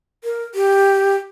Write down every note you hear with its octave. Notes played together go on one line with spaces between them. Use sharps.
A#4
G4